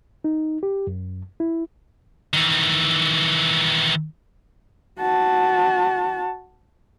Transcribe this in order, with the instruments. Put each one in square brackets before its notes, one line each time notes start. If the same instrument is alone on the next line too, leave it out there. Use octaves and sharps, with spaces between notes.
[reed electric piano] D#4
G4
F#2
E4
[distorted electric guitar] D#3 E3
[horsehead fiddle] F#4 A5